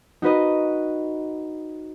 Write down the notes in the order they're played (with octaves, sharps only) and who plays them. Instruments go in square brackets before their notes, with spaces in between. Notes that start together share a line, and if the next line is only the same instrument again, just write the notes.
[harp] D#4 F#4 B4 D#5